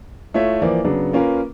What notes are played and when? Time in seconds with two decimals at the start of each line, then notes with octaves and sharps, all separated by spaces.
0.34 A3 E4 F4 C#5 E5
0.62 E3 F3 A#3 D5
0.84 C#3 F#3 B3 D4
1.13 A#3 C#4 F4 A#4 B4